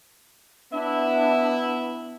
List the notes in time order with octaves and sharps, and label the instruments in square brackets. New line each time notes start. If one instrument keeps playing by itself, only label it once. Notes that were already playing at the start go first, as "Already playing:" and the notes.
[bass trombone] B3 [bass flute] D4 [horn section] E4 [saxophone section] E5